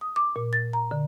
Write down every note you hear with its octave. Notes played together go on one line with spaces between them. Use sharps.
D#6
D6
A#2
A6
A#5
D3